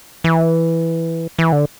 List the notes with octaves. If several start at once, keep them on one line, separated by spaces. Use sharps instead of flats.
E3
E3
D3